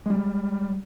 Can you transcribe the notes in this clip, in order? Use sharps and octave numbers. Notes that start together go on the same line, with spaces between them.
G3 G#3